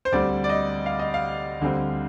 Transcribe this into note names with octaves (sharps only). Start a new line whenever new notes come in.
C5
D2 D3 G3 C4 D5
D5
D#5
F5
D#5
F5
D2 D3 G3 C4